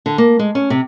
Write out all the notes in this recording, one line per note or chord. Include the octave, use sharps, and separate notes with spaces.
D3
A#3
G#3
C#4
C3